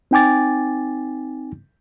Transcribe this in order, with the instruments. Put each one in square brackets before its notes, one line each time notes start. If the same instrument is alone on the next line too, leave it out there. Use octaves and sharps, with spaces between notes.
[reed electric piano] C4 D#4 G5 G#5 D6 A6